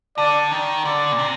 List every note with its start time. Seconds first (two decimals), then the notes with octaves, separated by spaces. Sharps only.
0.18 D3 D5
0.51 D#3
0.85 D3 D5
1.12 A#2
1.18 C3